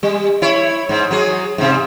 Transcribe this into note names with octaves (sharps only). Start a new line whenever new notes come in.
G3
E4 C#5
G#2
F#3 G#4
G#2 C3